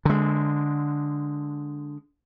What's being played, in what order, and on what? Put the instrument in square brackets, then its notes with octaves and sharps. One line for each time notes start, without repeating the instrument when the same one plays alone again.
[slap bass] D3 G#3